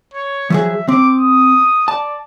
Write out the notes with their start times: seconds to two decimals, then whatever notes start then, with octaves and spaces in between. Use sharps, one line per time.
0.13 C#5
0.50 F3 F#3 G#4 E5
0.88 C4 D6
1.17 D#6
1.88 D5 A5